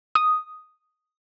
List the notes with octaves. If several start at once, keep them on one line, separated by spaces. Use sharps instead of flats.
D#6